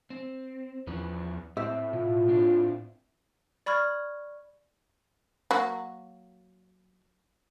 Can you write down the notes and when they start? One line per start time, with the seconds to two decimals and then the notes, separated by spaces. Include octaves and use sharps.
0.10 C4
0.87 E2 F3 C#4 B4
1.57 A2 C4 E5
1.93 B2 F4
2.28 B3 C4 D4
3.66 D5 B5 C#6 F6 G#6
5.51 F#3 A#3 F#4